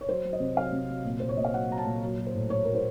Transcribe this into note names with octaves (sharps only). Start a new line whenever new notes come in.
C#5
F#3 C5
F#3
D#5
C3
F#3 F5
C3
F#3
A#2
A#2 C5
C#5
A#2 D#5
F5
F#3 F#5
F#3 A#5
A5
A#2
F#3
F#3
C5
A2
F#3 C#5
F#3 A#4
C5